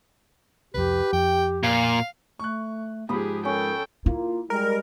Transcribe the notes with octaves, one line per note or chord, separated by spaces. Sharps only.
C2 F2 G4 B4
F2 G5
A#2 F5
A3 C#6 F#6
G#2 F3 G4 G#4 B5 D#6
C#4 A4 A#4 G5
A#3 E4 F4
G3 G#3 A#4